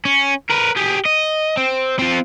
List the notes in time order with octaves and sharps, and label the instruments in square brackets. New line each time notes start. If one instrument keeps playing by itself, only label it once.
[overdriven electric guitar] C#4
A#4 B4
G4 G#4
D#5
C4
C4 F4